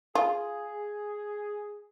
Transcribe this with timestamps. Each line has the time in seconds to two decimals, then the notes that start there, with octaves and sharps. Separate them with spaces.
0.15 F4 G#4